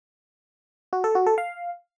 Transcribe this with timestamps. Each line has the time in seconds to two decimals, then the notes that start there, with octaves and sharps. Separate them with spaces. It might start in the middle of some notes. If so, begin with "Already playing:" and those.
0.93 F#4
1.04 A4
1.15 F#4
1.26 A4
1.38 F5